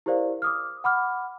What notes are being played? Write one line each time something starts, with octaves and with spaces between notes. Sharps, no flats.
E4 G4 A#4 C5 D5 F5
D6 D#6 F6
F#5 B5 D6 F6